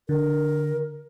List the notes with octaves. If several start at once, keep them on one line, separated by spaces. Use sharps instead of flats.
D3 A#4